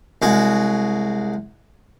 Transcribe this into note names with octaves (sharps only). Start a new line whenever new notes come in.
C2 G#3 F#4